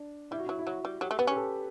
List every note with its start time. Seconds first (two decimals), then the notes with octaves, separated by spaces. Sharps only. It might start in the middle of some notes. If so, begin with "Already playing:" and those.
Already playing: D4
0.31 G3 E4
0.38 F#4
0.46 F#3 E4
0.59 E4
0.67 F#3 F#4
0.85 G3
1.01 F#3 G4
1.11 A3
1.19 B3 B4
1.27 C#4 G4
1.36 A4